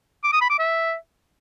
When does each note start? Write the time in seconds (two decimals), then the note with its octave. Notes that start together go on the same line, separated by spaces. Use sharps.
0.24 D6
0.33 D#6
0.41 B5
0.50 D6
0.59 E5